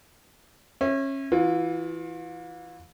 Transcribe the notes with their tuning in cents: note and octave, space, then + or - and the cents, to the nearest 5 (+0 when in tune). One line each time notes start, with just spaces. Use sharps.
C#4 -25 E5 +0
E3 +0 F4 +35